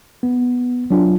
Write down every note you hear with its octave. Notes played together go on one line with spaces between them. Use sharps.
B3
F#3 D4 F4